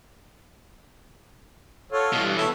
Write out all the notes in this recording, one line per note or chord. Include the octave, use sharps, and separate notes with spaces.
F4 F#4 A4 C#5
G2 B2 E3
B3 E4 A4 C#5